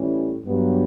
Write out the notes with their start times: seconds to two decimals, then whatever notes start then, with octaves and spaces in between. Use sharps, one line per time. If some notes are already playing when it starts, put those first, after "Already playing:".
Already playing: A2 E3 G3 C#4
0.45 G2 F#3 B3